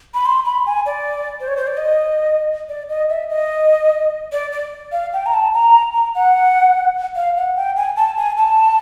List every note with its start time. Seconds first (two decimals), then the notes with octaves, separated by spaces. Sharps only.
0.14 B5
0.26 C6
0.45 B5
0.66 G#5
0.86 D5
1.40 C5
1.48 C#5
1.57 C5
1.67 D5
1.77 D#5
2.69 D5
2.89 D#5
3.10 E5
3.30 D#5
4.32 D5
4.52 D5
4.92 F5
5.13 G5
5.26 A#5
5.33 A5
5.54 A#5
5.93 A#5
6.15 F#5
7.16 F5
7.37 F#5
7.56 G5
7.76 G#5
7.96 A5
8.17 G#5
8.37 A5